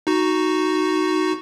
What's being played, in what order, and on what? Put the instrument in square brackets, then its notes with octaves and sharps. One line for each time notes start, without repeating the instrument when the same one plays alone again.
[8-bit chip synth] D#4 F#4